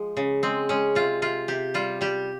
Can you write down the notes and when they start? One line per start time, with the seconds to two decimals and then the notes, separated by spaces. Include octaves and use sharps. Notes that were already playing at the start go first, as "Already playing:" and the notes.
Already playing: F3 G#3
0.17 C#3
0.43 G#3 C4
0.69 G#3 C#4
0.95 C3 F4
1.22 C3 F4
1.48 C3 G4
1.74 G3 F4
2.01 G3 G4